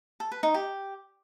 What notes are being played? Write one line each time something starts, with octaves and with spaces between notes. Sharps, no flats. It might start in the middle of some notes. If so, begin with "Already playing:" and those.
A4
B4
D#4
G4